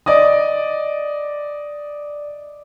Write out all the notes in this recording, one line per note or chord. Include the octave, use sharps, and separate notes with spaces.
D5 D#5 D#6